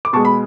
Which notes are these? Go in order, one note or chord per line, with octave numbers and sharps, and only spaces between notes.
D6
B2 G#3 A5 C#6
B5